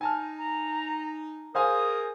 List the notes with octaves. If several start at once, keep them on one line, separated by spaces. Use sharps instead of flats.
D#4 G#5 A5 F6
A#5
G#4 A#4 C5 F5 G#5 D#6